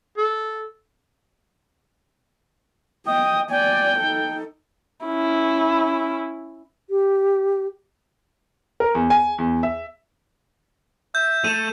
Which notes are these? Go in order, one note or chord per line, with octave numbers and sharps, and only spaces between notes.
A4
D#5 G5 D#6
D5 G5 G#5
D#4 A4
C#4 E4
G4
A#4
E2
G#5
E2
E5
E5 G6
A3 D#7